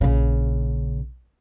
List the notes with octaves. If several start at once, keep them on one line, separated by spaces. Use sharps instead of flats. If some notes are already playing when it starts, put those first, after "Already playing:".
A#1 C#3